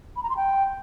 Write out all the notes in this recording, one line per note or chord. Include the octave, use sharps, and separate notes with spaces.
B5
A#5
C6
G5